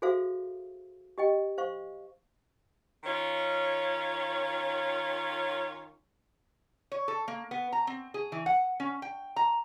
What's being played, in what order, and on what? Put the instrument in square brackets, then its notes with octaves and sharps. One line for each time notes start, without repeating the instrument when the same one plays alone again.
[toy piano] F#4 G#4 A4 C5 E5 F5
G4 D#5 G5
C5 F5 C#6
[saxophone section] D#3 C#4 F4 C#5
[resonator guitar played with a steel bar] C#5
A4
A#3
B3
A#5
C4
G#4
E3
F#5
C#4
G5
A#5